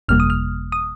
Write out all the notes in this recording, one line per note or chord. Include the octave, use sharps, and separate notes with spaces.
G1 F2 C3 G3 A#3 F6
D#6
F6
D#6